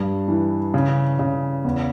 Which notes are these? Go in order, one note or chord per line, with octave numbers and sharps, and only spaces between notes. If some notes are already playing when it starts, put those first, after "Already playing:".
Already playing: G2
E3
C#3
C#3
E2